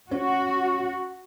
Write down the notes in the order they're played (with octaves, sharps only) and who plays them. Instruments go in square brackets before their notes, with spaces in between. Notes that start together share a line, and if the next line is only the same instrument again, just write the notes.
[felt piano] C#4 [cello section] F#4